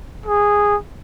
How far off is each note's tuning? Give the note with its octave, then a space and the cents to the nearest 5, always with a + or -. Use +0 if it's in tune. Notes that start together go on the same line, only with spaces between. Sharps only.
G#4 -10